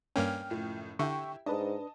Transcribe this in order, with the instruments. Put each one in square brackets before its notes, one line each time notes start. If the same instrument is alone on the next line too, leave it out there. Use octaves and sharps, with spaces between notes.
[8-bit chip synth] G2 A#3 C#4 [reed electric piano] G5 F6
[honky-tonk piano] F#1 A2 F3
[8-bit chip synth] D3 [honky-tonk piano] E4 G4 E5 [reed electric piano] G5 C#6
[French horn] G#2 [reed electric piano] D4 B4 [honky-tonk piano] D#5 A5